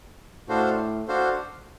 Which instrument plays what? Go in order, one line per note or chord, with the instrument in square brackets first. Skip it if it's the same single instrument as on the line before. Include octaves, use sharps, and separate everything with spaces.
[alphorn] A2 [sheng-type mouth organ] D4 F#4 A4 C5 F5
[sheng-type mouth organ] D4 F#4 A4 C5 F5